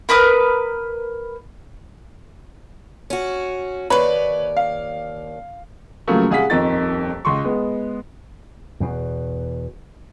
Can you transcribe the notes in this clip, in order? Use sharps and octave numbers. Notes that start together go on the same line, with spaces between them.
A#4 B4 A#5 D#6
C#4 F#4
D#2 B4 C#5 D5 B5
F5
C#3 F3 F#3 A3 A#3 C#4
C2 G#4 F5 F#5 B6
D#1 F2 D#3 A6
C#2 C6 C#6
G#3 B3
E2 B2